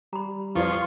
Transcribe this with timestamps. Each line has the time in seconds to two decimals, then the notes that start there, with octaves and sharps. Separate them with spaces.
0.13 G3 A#5 B5
0.55 F2 F3 E4 F4 B4 D5 C6 C#6